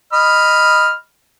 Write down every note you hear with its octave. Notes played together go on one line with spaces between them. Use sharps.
D#5 B5 F6